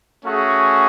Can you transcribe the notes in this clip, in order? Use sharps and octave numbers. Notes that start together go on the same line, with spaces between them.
A3 C#4 F#4 G#4